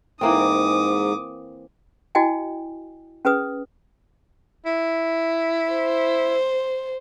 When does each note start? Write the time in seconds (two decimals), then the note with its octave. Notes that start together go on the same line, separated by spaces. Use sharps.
0.21 G#2 E3 A#3 C4 D6 D#6
2.15 E4 F#4 D#5 G5 G#5
3.25 C#4 G#4 B4 D#6
4.66 E4
5.72 C5